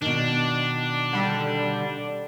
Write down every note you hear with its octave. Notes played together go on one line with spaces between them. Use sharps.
B2 D#3 D4
D3 G3